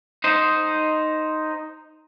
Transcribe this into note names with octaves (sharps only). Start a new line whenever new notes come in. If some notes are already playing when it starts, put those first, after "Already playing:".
D#4 C5